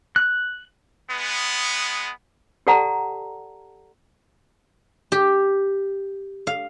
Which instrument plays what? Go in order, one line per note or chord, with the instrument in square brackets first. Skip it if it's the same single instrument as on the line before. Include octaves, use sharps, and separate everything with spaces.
[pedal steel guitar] F#6
[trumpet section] G#3 B3
[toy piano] G4 A4 D5 F#5 A5 A#5
[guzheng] G4
F5